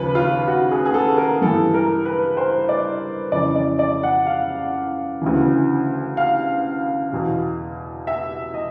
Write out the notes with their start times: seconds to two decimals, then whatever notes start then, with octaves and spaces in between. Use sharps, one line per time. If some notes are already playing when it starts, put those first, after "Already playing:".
Already playing: D#2 C#3 F3 B4
0.15 F4
0.48 F#4
0.71 G#4
0.86 G#4
0.94 A4
1.18 A#4
1.42 G2 E3 A4
1.74 A#4
2.06 B4
2.37 C5
2.69 D5
3.32 F2 C#3 E3 D5
3.55 D5
3.79 D5
4.03 F#5
4.27 F5
5.21 D2 C#3 E3
6.17 F5
7.12 E2 B2
8.07 E5
8.54 D#5